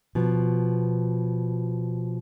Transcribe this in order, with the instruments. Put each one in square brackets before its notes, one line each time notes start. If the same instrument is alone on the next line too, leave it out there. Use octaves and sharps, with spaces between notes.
[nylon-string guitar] B2 F3